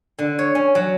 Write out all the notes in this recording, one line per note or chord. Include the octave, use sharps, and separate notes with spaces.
D3
C#5
C#4
F#3